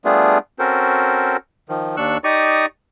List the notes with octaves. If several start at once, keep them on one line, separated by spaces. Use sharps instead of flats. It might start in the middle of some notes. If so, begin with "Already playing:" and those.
G3 A3 B3 D4 F4 G#4
C4 C#4 F#4 A4 A#4 C5
D#3 F3
D#2 D4 C#6 E6 F#6
D#4 G4 D5 A#5 C#6 D#6